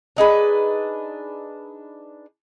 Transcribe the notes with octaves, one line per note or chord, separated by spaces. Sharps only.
D4 D#4 G#4 B4